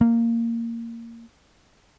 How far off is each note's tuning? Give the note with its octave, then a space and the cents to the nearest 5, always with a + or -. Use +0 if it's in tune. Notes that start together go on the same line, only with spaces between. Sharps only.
A#3 -15